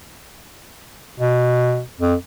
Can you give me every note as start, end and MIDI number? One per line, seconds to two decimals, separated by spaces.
1.20 1.82 47
2.00 2.15 41